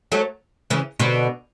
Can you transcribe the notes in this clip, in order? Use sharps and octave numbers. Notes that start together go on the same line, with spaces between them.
F#3 A3
C#3 E3
B2 D3